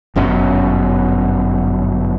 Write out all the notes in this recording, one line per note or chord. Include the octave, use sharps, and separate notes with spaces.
G1 F#2 B2 C#4